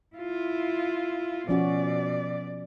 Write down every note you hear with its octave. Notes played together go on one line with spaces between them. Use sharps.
E4 F4
B2 F3 C#4 F#4 D5